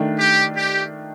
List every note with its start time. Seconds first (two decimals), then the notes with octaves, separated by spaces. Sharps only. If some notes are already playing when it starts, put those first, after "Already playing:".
Already playing: D#3 A3 D4
0.19 G4
0.56 G4